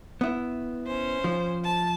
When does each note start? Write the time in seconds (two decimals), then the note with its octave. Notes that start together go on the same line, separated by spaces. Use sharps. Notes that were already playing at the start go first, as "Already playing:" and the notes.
0.21 B3 E4
0.86 C#4 C5
1.24 F3
1.63 A5